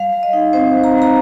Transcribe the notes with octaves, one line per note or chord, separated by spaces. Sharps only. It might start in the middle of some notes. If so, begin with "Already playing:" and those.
Already playing: G3 F5
G3
D#5
D#4
C4 C5
G3
A#5
G3
A#5